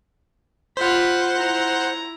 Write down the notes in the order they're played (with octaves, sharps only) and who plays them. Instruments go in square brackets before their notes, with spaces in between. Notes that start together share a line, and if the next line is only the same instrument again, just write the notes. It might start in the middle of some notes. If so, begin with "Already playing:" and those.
[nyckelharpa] F4 B5 [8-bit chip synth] C5 F#5
[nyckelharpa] E4 A#5